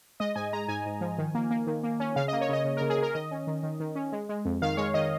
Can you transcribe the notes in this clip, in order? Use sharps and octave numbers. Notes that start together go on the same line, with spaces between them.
G#3 D#5
G#2 G#5
G#3 A#5
G#2 G#5
G#2
F3
D#3
A#3
A#3
D#3
A#3
C#4
C#3 F5
D#5
A#3
C#5
C#3 D#5
C#3
A#4
C#3
G#4
C#3 A#4
D#3 D#5
C#4
D#3
D#3
D#3
C#4
G#3
G#3
F2
D#3 F5
G#3 C#5
D#3 D#5